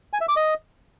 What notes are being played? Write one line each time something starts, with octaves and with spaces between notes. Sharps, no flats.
G#5
E5
D6
D#5